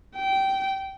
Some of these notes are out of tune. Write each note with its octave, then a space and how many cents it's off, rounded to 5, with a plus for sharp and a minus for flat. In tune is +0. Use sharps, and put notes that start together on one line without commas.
G5 -15